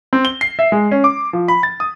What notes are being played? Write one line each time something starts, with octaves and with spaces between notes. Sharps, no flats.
C4
G7
C7
E5
G#3
C#4
D6
F3
B5
A6
D#6